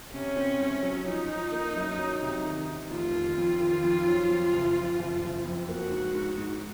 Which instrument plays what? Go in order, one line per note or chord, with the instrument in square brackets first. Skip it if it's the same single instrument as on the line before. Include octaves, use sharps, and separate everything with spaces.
[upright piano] C3 [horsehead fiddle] C#4
[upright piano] C4
C2
F#3
[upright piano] F3 [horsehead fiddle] D#4
[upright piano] F3
A#3
F#2
F#3
C3
D#3
D#3
[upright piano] F1 [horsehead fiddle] F4
[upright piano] D#3
F2
D#3
F2
F#3
F2
F#1
F2
F#1
F#1
F2
[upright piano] A#3 [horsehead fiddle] F#4
[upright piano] G#2
G#2
G#2